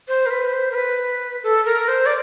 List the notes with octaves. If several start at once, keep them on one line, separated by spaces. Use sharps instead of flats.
C5
A#4
B4
C5
A#4
B4
A4
A#4
C5
D5